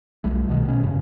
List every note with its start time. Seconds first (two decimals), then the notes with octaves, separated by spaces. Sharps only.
0.24 B1 G3 A3
0.48 C2 B2 D3 D#3
0.65 B2 C#4
0.83 F1 G2 C#3